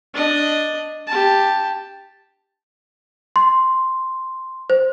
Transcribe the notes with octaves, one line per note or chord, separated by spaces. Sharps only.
D4 D#5
G4 A5
C6
C5